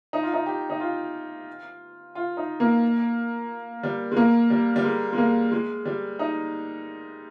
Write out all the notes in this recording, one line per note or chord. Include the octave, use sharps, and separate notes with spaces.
D#4
F4
D#4
G4
D#4
F4
F4
D#4
A#3
G3
G#3
A#3
G3
G3
G#3
G#3
A#3
G#3
G3
D#4